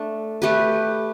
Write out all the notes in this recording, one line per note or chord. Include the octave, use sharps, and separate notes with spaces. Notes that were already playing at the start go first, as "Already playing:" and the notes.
Already playing: A3 D4 A4
A3 G4 B4